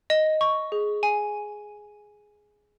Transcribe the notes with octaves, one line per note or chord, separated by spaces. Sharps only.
D#5
C#6
G#4
G#5